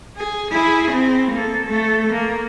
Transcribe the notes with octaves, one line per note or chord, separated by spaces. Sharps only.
G#4
E4 G#4
C4
A#3 A4
A3 A4
A#3